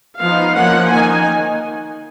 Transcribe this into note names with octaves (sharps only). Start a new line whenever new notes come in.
F3 B3 D#4 F5
F3 A#3 C#4 F#5
D#3 A#3 D#4 G#5